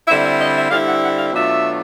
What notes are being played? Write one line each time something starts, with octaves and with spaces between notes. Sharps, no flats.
D3 G3 C4 E4 E5
E5
D#5
E5
D3 G3 C4 E4 F5
F#5
F#5
F5
B2 F#3 A3 D4 F4 E5